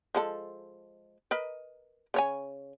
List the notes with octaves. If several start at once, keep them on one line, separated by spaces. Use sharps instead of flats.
F3 G#3 A4
A#4 B4 D#5
C#3 C#5 G#5